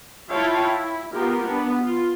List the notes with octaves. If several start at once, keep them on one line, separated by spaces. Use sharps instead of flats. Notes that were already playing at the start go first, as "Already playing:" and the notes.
E4 F4 C#5 F5 G5 A5
E4
B3 F4 G4 A#4
B3 D4
F4